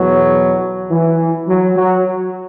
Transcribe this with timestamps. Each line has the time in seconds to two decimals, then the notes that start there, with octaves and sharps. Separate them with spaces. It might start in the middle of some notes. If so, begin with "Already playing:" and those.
Already playing: E2 B2 F#3
0.91 E3
1.48 F#3
1.77 F#3